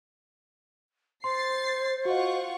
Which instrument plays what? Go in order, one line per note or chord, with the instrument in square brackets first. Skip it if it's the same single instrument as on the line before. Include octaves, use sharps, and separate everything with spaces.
[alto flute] C5 [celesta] C6 [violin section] A6 C7
[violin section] F4 F#5 C#6 [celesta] F#4 D#5